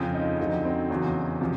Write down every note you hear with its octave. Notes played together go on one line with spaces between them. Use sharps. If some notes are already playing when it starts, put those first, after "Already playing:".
Already playing: F2 C#3 F3 C4
D#4
F2 D3 F#3 D#4
C4
E2 C#3 F#3
C3 F3